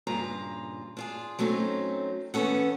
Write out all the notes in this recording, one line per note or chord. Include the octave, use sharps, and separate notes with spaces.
G2 A#2 C#3 F4 A#5
D4 F4 G#4
F#3 A3 C4 C#4 D#4
E2 B3 C#4 A4 F#5